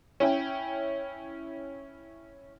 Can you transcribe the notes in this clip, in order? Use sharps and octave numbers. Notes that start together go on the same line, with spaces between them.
C#4 E4 G5